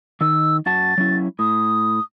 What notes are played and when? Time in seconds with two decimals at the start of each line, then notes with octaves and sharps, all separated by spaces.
0.21 D#3 D#4 E6
0.66 F#2 F#4 A5 A6
0.98 F#3 C#4 E4
1.39 A2 D#6